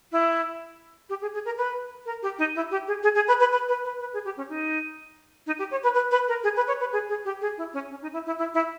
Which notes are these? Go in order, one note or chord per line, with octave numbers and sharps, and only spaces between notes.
E4
G4
G#4
G#4
A#4
B4
A#4
G4
D#4
E4
G4
G#4
G#4
G#4
B4
B4
B4
B4
B4
B4
G#4
G4
C#4
D#4
D#4
G4
C#5
B4
B4
B4
A#4
G#4
B4
C#5
B4
G#4
G#4
G4
G#4
E4
C#4
C#4
D#4
E4
E4
E4
E4